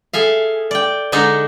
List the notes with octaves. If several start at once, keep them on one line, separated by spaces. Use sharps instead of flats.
G#4 A4 E5 F5
D5 G5
D3 G#3 D4 D#4 A4 A#5